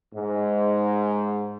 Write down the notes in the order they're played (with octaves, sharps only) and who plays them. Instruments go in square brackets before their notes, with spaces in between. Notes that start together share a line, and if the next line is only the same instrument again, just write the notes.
[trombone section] G#2